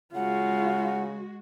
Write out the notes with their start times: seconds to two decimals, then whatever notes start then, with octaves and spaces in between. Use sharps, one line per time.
0.15 C#3 G#3 F4 F#4 F#5